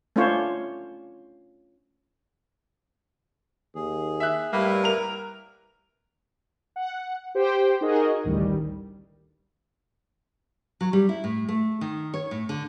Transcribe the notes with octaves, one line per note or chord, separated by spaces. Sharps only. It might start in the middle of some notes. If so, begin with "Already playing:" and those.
A3 C#4 D4 F4 C5 C#5
D#2 G#4
E5 F#6
A2 G3 A#3 E4 B4
A#4 F7
F#5
G4 C5 G5
D#4 F#4 G#4 A#4 D#5
A1 D2 D#3 G3
F#3
G3
E4
A2
A3
D#3
C#5
A2
D3